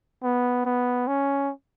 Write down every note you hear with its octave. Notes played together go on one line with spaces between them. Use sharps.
B3
B3
C#4